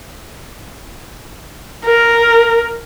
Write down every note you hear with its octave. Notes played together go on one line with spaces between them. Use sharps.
A#4